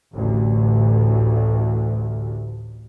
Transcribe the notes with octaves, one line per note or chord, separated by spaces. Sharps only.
A1 D2